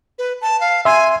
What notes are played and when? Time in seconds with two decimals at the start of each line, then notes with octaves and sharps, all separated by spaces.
0.19 B4
0.41 A5
0.61 F5
0.85 E5 G#5 C6